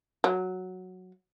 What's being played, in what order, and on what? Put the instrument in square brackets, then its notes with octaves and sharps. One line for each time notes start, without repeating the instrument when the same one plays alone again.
[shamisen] F#3